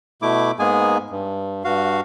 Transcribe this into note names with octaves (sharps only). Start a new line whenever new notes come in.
B2 A3 E4 D6
G#2 G#3 A#3 B3 G#4 G#5
G2
G2 F#4 F5